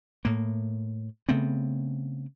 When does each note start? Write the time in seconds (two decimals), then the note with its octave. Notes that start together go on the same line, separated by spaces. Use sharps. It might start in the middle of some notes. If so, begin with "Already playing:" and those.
0.25 A2 A#3
1.29 C#3 A3 B3 C4